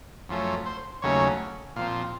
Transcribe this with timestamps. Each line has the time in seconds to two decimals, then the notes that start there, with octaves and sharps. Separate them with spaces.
0.29 F#2 F3 A3 C#4
0.66 C5
1.02 D#2 C#3 F#3 A3 C#4 C#5
1.76 A#2 F3 C4 F5